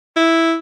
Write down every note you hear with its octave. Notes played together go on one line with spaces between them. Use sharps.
E4